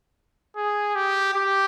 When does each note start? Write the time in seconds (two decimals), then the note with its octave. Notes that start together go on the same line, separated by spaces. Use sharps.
0.57 G#4
0.95 G4
1.34 G4